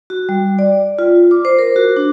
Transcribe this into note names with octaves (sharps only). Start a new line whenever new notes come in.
F#4
G3
D5
F4
D6
C5
A#4
F#4
D4